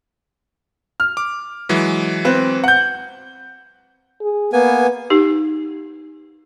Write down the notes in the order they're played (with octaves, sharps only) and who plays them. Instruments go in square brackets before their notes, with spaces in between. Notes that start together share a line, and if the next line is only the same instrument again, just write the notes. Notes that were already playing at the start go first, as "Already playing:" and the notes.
[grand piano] F6
[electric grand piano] D6
E3 F#3 G#3
[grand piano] C4 B4
F#5 G6
[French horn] G#4
[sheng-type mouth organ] A#3 B3 G#5 [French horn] B4
[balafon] D#4 G4